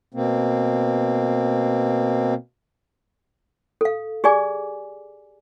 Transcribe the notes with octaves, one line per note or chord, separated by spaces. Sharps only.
B2 A#3 C4
A4 F5
G4 G#4 D5 G#5 D6